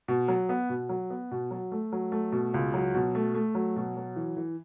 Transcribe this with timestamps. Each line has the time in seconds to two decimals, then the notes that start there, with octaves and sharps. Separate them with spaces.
0.08 B2
0.28 F#3
0.49 B3
0.69 B2
0.89 F#3
1.10 B3
1.31 B2
1.51 F#3
1.72 A3
1.93 F#3
2.12 A3
2.32 B2
2.54 C#2
2.74 F#3
2.94 B2
3.15 A3
3.34 A3
3.55 F#3
3.76 B2
3.97 F#3
4.16 E3
4.36 E3